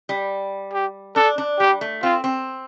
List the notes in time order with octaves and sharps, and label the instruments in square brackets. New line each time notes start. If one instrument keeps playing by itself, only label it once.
[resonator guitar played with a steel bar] G3
[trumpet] G4
[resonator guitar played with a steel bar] D4 [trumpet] A4
[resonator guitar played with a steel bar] D4
[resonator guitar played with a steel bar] G3 [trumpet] G4
[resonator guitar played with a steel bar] A3
[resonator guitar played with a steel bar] C4 [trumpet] F4
[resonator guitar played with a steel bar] C4